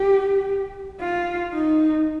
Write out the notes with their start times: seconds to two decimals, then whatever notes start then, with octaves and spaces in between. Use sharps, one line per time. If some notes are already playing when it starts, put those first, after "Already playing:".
Already playing: G4
1.01 F4
1.53 D#4